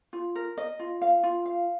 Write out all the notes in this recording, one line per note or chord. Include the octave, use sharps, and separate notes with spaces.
F4
A#4
D#5
F4
F5
F4
F5